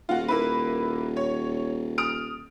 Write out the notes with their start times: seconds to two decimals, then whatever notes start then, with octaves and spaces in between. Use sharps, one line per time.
0.09 D#1 F4 F#4
0.28 A#3 E4 B4
1.17 C#5
1.98 D#6 F6 D7